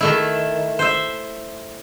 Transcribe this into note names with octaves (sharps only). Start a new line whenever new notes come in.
D#3 A3 E4
C5 E5